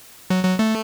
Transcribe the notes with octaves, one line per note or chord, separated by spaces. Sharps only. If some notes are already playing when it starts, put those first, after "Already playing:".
F#3
F#3
A3